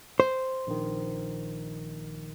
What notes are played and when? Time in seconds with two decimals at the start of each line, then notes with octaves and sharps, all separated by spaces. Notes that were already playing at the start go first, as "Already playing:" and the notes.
0.20 C5
0.67 A#1 D#3